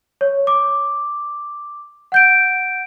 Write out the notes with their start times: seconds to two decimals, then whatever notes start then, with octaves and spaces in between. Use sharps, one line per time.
0.21 C#5
0.47 D6
2.12 F#5 G6 D7